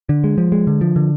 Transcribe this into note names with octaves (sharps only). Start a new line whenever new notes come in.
D3
G#3
F3
G#3
D3
F3
D3